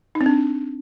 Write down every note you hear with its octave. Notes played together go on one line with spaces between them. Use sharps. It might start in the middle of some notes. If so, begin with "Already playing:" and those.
D#4
C4
D4